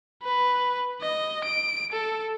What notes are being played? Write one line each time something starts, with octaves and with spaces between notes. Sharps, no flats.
B4
D#5
D7
A4